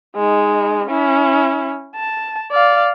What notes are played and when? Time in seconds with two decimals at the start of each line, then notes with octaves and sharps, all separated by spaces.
0.16 G#3 D#4
0.87 C#4 E4
1.96 A5
2.52 D5 F5